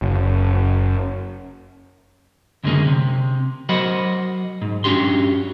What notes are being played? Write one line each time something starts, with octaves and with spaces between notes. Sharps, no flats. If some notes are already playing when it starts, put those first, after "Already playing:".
F#1
C#2 F#2 D3 G#3 A#3 C#4
C3
F#3 A#4 C5 D#5 F#5 B5
G#2
G2 C#4 D4 F#4 G4 C6